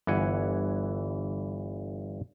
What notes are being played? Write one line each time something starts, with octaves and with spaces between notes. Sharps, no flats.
G1 E3 F#5 G#5